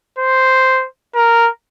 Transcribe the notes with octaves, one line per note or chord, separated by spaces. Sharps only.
C5
A#4